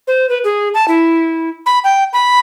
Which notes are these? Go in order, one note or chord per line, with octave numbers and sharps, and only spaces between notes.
C5
B4
G#4
A5
E4
B5
G5
B5